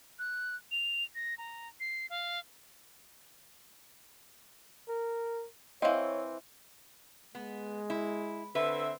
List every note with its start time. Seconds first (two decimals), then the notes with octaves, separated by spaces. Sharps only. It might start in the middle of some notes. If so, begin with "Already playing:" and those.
0.19 F#6
0.71 F7
1.15 A#6
1.38 A#5
1.80 C7
2.10 F5
4.89 A#4
5.82 E3 C4 C#5 D#5 F5
7.35 G#3 B3
7.90 E4
8.55 D3 C4 B4 E5